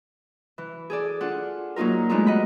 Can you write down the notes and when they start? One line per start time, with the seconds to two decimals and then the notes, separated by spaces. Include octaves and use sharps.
0.58 E3
0.90 G#4 A4 D5
1.21 D4 F4 F#5
1.76 F#3 A#3 D#4 F4 A#4
2.09 G#3 A3 B3 D4 D#4 F4
2.27 D#5 F#5 B5